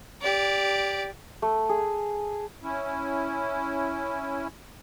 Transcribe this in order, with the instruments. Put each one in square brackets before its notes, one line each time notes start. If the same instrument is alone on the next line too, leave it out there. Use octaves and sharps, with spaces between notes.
[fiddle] G4 D5
[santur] A3
G#4
[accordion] C#4 E4